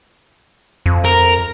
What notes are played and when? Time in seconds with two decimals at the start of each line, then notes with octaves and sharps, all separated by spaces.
0.86 F2
1.05 A#4